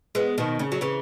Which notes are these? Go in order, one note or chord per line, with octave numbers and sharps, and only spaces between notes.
G#3 B3
B2 D#3
C#3
F#3
C#3 E3